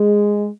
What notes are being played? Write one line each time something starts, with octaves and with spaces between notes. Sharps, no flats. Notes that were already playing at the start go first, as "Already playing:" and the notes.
Already playing: G#3